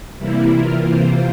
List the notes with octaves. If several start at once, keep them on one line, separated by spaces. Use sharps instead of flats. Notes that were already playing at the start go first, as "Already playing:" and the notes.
C3 E3 G3 A#3 E4
E3 A#3 F4 A#4
C3 E3 A#3 F4 C5